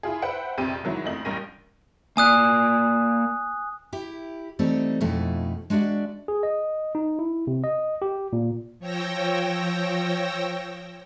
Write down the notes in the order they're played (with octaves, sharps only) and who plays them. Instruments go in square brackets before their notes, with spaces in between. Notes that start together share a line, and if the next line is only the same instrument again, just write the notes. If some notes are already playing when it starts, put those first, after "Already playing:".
[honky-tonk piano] E4 F4 G#4
B4 C5 E5 F#5 G5
A#1 F2 C3 G4 D#7
G#2 D#3 F#3 E4
F#1 F2 A3 D#5 F#7
A1 G2 A#4 A#6 D#7
[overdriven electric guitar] A#3 D5 [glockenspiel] G#5 D#6 F#6
[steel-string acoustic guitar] E4 G4
E3 G3 A3 C4 D#4 A4
F2 B2 F3 A3 D#4 E4
G#3 D4 F#4 D5 E5
[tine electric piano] G#4
D#5
D#4
E4
C3
D#5
G4
A#2
[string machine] F3 C#5 G5 E6 A#6